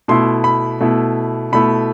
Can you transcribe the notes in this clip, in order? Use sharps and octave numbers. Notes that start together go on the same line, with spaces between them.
B2 A3 E4 C6
B5
B2 A3 E4
B2 A3 E4 B5